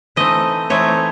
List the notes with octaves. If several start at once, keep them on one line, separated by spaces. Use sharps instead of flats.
E3 A3 C4 D#4 D#5
E3 A3 C4 D#4 C#5